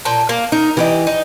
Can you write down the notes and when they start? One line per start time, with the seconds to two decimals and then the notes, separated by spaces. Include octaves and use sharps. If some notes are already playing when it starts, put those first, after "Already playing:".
0.05 A#2 G5 A5
0.29 A#3
0.52 D#4 A#4
0.77 E3 G4 A#4 D#5
1.07 D#4